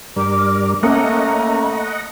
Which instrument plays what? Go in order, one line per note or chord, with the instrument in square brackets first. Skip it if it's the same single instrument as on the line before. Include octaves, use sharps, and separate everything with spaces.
[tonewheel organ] G2 G3 A#4 [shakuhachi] D6
[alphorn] A3 [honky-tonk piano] A#3 C#4 [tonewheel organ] D#5 F#5 [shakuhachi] A#5